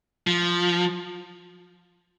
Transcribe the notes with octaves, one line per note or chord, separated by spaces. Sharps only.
F3